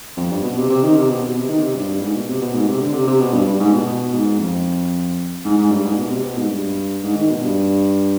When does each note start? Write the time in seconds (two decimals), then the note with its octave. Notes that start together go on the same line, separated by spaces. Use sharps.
0.17 F2
0.30 G2
0.43 B2
0.57 C3
0.69 C3
0.83 D#3
0.96 C3
1.09 B2
1.22 B2
1.36 C3
1.49 D#3
1.62 C3
1.75 G2
1.88 G2
2.01 G#2
2.15 B2
2.28 C3
2.41 B2
2.54 G#2
2.67 C3
2.81 D3
2.94 C3
3.07 C3
3.20 B2
3.34 G2
3.47 G2
3.60 G#2
3.73 B2
3.86 B2
4.13 G#2
4.39 F2
5.45 G#2
5.58 G#2
5.71 G2
5.84 G#2
5.97 B2
6.10 C3
6.23 B2
6.37 G#2
6.50 G2
7.03 G#2
7.16 D#3
7.30 B2
7.42 G2